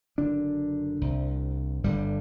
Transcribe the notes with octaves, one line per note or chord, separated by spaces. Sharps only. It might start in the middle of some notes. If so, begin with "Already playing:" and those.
F#1 F#2 D3 D4
C2 C3
G1 G2 D3 G3